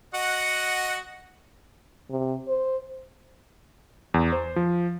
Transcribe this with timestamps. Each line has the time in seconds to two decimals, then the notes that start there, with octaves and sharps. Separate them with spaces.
0.14 F#4 D#5 F#5
2.10 C3
2.48 C5
4.14 E2
4.32 C5
4.56 F3